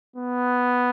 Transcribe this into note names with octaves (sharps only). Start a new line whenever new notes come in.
B3